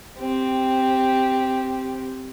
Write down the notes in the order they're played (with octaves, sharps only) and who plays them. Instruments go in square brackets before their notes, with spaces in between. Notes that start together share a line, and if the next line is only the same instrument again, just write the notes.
[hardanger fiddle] C4 G4